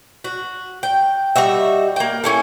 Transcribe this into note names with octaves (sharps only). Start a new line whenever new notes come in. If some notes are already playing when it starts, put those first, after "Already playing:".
F#4
G5
G3 D#4 F#4 E5
A#3 G5
C#4 E4 A4